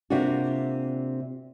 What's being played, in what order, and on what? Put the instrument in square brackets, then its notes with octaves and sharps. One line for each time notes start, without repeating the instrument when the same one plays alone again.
[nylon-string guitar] C3 A#3 D4 F4 F#4